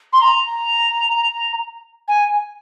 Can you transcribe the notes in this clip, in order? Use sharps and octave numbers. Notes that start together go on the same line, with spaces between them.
C6
A#5
G#5